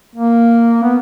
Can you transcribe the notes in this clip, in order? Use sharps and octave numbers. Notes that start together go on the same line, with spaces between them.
A#3
B3